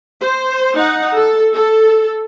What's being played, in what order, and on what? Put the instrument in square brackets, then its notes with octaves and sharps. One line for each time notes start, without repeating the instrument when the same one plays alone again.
[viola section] C5
D#4 F#5
A4
A4